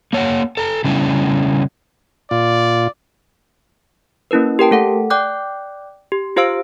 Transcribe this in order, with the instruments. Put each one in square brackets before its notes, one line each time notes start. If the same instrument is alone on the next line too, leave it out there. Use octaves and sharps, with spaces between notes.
[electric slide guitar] A#3 C#5 E5 F#5
A4 A#5
C#3 G3 C#4 D4 E4
[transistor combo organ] A#2 F4 [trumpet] D5
[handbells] A#3 C#4 E4 A#4 B4
G4 A#4 G5 A5
A3 A4 F#5
D5 G5 D6 F#6 G6
G4
F4 G4 C5 F5 E6 D7